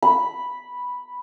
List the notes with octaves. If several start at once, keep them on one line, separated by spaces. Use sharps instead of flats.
B5